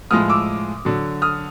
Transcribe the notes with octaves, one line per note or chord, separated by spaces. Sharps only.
A2 F3 G#3 D#6 F6
D6 E6
D3 F#3
D#6 F6